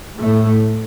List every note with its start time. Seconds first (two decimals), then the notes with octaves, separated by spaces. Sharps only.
0.18 A2 A3